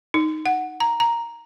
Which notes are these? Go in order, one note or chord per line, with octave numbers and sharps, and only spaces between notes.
D#4
F#5
A#5
A#5